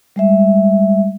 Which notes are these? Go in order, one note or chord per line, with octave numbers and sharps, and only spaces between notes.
G3 G#3 E5